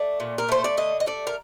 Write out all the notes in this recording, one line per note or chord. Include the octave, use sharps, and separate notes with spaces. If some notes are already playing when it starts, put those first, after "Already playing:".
Already playing: A3 D5
A#2
A#4
A3 C5
D5
D3 D#5
D#5
A3 D5
A#4